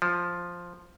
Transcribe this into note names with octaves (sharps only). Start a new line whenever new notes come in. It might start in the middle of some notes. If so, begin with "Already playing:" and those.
F3